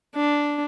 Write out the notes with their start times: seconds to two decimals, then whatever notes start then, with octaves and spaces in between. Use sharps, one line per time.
0.15 D4